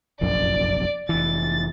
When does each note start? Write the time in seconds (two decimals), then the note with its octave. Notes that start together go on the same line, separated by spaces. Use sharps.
0.21 F1 A#1 F#2 D5
1.09 F1 E3 A6